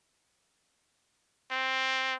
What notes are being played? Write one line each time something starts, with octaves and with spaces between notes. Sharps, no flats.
C4